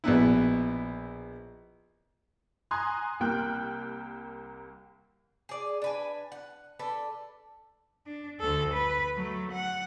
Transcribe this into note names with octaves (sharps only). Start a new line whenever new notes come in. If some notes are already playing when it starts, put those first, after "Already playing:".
A#1 B2 B3 E4
G#5 A#5 C6 D#6 F#6 G#6
C2 G3 A#3 G5 F6 F#6
G#4 D5
D4 B4 G#5
F#5
D4 A4 B4
D4
D2 A4
B4
F#3 A3
F#5